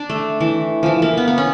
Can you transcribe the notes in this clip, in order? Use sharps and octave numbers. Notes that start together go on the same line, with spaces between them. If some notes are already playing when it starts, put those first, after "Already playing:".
Already playing: D4
A3
E3
E3 F3
A#3
B3
B3
C#4